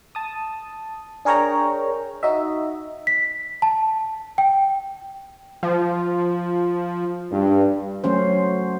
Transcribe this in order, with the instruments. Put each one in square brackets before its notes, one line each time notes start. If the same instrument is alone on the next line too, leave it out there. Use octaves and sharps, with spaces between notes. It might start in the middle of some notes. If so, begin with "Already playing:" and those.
[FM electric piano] A5 D#6
D4 G#4 A#4 C#5 G5 A#5
D#4 F#4 D#5 E5
[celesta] B6
A5
G5
[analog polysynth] F3
[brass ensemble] G2
[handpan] F#3 A3 C#4 C5